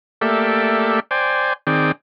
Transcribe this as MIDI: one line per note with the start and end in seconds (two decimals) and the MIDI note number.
0.21 1.00 57
0.21 1.00 58
0.21 1.00 67
0.21 1.00 69
0.21 1.00 74
0.21 1.00 76
1.11 1.53 72
1.11 1.53 74
1.11 1.53 79
1.11 1.53 80
1.67 1.92 51
1.67 1.92 60
1.67 1.92 68
1.67 1.92 74
1.67 1.92 79